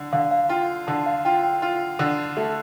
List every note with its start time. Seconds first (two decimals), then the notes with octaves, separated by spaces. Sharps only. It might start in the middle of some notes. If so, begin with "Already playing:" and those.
Already playing: D3
0.13 D3 F5
0.31 F5
0.49 F4 G5
0.87 D3 A5
1.06 F5
1.25 F4 G5
1.43 G5
1.62 F4
1.99 D3
2.37 A3 A5